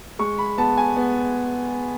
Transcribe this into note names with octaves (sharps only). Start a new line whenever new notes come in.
G#3 C#6
B5
B3 A5
G#5
B3